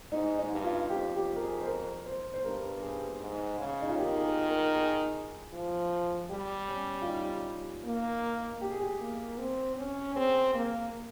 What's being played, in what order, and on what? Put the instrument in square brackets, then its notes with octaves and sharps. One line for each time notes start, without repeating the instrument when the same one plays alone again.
[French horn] G#2 [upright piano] D#4
[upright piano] D#4
[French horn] G2
[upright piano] F4
[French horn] F2 [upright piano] G4
[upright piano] G4
A#4
G#4
C5
A#4
C5
C5
[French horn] G2 [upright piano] A#4
[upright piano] G#4
[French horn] G#2
C#3
[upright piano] D#4
F4
[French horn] D#3 [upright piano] G4
[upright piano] G#4
A#4
A#4
G#4
[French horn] F3
[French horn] G3 [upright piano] G4
[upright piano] C#4
F4
D#4
[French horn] A#3
[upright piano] G4
G#4
G4
[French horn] A#3
C4
C#4
[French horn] C4 [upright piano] G#4
[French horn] A#3